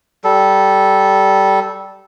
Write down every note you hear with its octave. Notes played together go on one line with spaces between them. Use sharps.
G3 A4